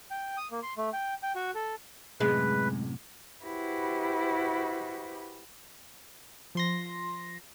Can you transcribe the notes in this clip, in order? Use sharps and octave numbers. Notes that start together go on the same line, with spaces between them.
G5
D#6
A#3
C6
A3
G5
G5
F#4
A4
F#2 A2 C3 G#3 B4
E4 F#4 G4 B4 C5
F3 C6 A#6